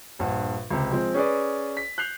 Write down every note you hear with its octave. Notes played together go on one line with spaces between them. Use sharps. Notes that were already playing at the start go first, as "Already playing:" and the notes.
A#1 G2 F#5
C#2 C3
F3 G#3 C4
C#4 G#4 B4 D5
B6
F#6 G6 C7 F7